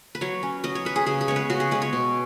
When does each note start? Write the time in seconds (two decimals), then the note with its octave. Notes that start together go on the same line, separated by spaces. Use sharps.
0.15 B4
0.21 F#3 C#5
0.43 C#4
0.64 F#3 D#5
0.75 C#5
0.85 C#4 B4
0.96 G#4
1.06 C#3 G#4
1.21 G#4
1.28 G#3 B3 C#5
1.36 B4
1.50 C#3 F#4
1.60 G#4
1.71 G#3 B3 B4
1.82 C#5
1.93 B2